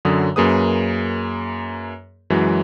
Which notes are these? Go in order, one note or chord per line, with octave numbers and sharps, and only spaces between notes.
F#2 D3 F#3 D#6
F#2 A#3 G#4 B4 D#6
F#2 E3 F#3 G#3